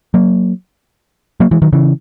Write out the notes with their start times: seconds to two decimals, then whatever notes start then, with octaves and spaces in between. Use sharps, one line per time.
0.14 F#3 A#3
1.40 F#3 A#3
1.51 E3 G#3
1.62 D#3 F#3
1.73 C#3 E3